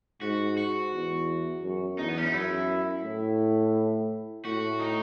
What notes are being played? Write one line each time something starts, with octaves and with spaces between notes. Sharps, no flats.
G#2 F#4
F#4
E2
F#2
E2 D#4
B3
C#4
D#4
F#2 E4
A2
A2 F#4
D#4